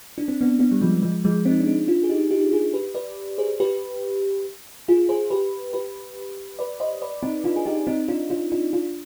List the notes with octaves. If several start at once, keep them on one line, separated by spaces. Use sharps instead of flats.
D4
C4
B3 D4
B3 D4
G3
F3 G#3
F3 G#3
F3 G#3
C4 D#4
D4
C4 D#4
D4 F4
G#4
D#4 G4
D#4 G4
F4 G#4
G4 B4
B4 D5
G#4 C5
G4 B4
F4 G#4
G#4 C5
G4 B4
G4 B4
B4 D5
C5 D#5
B4 D5
C4 D#4
D4 F4
G#4
D#4 G4
C4 D#4
D4 F4
D4 F4
D4 F4
D4 F4